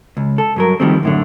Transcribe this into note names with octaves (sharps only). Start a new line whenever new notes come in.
C#2
A4
G2 F#3 A#4
D#3 F3 G3 A3 C4
F#2 A2 D3